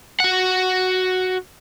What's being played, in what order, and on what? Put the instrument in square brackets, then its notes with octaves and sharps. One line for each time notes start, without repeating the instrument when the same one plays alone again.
[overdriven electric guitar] F#4 F#5